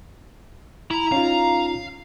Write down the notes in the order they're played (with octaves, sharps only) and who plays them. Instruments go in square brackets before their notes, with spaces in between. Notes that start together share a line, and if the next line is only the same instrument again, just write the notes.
[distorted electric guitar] E4 [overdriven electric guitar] A#5
[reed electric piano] C#4 D#4 F4 [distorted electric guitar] F5